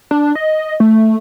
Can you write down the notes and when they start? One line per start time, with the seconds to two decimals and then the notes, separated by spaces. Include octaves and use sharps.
0.11 D4
0.35 D#5
0.80 A3